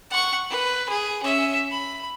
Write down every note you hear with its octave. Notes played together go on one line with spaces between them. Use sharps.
F#5 C#6
B4
G#4
C#4 E5
B5